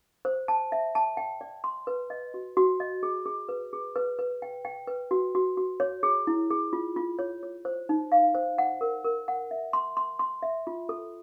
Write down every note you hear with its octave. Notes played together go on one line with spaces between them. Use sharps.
C5
A5
E5
A5
G5
D5
C6
B4
D#5
F#4
F#4
D#5
G#4
G#4
B4
G#4
B4
B4
G5
G5
B4
F#4
F#4
F#4
C#5
G#4
E4
G#4
F4
F4
C#5
C#5
C5
D#4
F5
C5
F#5
A#4
A#4
F#5
E5
C6
C6
C6
E5
F4
A4